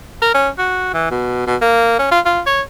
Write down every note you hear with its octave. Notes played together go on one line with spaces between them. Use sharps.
A#4
C#4
F#4
E3
B2
B2
A#3
C#4
F4
F4
C#5